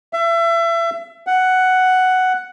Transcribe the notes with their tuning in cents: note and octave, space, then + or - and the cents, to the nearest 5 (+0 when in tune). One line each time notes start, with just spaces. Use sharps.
E5 +30
F#5 +5